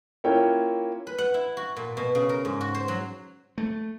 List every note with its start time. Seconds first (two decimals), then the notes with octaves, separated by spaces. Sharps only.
0.24 A#3 C#4 E4 F4 C#5 G5
1.07 B4
1.18 F#5
1.34 E4
1.57 F#4
1.76 A#2
1.97 B2
2.15 C#3
2.29 A#4
2.45 G#2
2.61 F#4
2.74 C5
2.88 F#3
3.58 A3